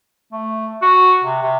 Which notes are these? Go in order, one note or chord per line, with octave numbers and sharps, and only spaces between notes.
A3
F#4
C3
C3